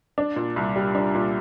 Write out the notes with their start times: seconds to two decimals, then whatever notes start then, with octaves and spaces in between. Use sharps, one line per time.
0.18 D4
0.36 A#2
0.56 C2
0.76 G3
0.95 D4
1.15 A#2